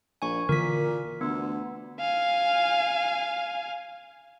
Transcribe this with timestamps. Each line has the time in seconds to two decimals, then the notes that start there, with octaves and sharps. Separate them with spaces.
0.22 A#1 G#5 C#6
0.49 A#2 D3 E3 A#4 B6
1.21 D2 B3
2.00 F5 G#5